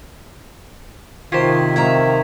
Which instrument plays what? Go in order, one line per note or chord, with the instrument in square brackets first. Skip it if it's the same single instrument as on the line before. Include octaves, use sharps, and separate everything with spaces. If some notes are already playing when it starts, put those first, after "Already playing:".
[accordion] C3 D#3 [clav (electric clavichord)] F4 G4 C5 [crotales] C#6 G#6 B6
[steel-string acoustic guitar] F2 E5 A#5 [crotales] G#6